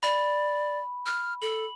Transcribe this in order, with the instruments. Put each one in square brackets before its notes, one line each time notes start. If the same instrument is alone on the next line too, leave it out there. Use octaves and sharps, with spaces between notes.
[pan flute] D5 [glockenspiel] B5
[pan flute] F6
[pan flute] A4 [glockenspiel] F#7